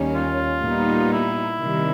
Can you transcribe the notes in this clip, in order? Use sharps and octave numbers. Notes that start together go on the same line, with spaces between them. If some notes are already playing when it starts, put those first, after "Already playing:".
Already playing: D#2 D#3 G3 A#3 C#4
F4
A#2 G3 B3 D#4
E4
C3 D#3 G3